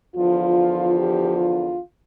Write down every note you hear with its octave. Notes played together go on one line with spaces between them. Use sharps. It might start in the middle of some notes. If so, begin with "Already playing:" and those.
E2 D3 F3 F4
G4
F4